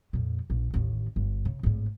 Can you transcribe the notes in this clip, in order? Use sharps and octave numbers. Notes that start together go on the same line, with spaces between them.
F2 A#2
A#1
A1 D#2
G1
C#3
G#1 A2